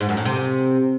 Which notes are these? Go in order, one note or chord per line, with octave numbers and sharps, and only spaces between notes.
G#2
F#2
A2
C3